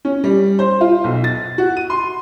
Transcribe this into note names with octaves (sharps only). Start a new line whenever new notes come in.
C#4
G3
C5
F4
B1
A6
F#4
D#7
C6